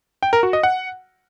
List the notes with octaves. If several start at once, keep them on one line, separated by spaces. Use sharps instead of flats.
G5
A#4
F#4
D#5
F#5